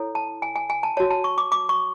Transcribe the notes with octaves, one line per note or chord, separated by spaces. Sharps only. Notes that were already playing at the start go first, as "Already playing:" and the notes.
Already playing: E4 A4 C#5
A5
G#5
G#5
G#5
A5
F#4 C#5 A5
A5
C#6
D6
D6
C#6